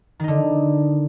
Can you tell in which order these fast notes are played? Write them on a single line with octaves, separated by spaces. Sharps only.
D#3 D#4 D3